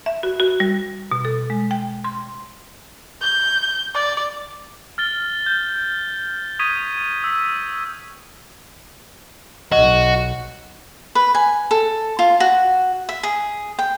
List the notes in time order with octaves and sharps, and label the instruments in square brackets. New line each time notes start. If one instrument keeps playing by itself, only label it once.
[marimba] E5
F#4
F#4
G3
B2
A4
G#3
G5
C6
[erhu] G6
D5
[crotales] F6 A6 G7
G6
F6
C#6 D#6 G#6 B6 D#7
E6 B6
[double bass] B1 [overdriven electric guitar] F#4 [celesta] D#5
[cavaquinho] B4
G#5
A4
F4
F#4
E5
G#4
G5